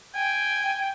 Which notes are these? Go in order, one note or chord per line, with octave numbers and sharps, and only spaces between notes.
G5 G#5